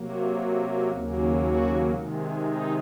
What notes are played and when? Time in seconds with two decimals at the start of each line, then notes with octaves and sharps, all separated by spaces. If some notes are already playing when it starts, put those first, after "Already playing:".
Already playing: C3 F#3 A#3
0.90 D#2 C#3 F#3 A#3
1.41 F#4
1.92 C3 D#3 G#3
2.43 D#4